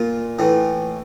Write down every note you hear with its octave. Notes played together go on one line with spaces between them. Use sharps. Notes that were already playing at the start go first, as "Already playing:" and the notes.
Already playing: A#2 F4
A2 E3